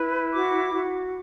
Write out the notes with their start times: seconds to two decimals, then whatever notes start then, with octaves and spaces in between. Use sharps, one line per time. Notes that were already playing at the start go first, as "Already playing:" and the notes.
Already playing: E4 B4
0.32 F#4 D6
0.73 F#4